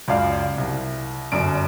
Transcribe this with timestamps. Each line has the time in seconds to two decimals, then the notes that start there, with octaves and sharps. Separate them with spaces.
0.08 C#2 F#2 D5 F5
0.58 C2
1.32 G1 F#2 D5 D7